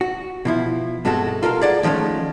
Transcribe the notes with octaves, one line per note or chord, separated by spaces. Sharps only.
F#4
B2 F3 E4
G2 B2 G#3 C4 F#4 A4
F4 A4 A#4 F5
G#4 D5 F#5
D#3 F3 G#3 A3 C#4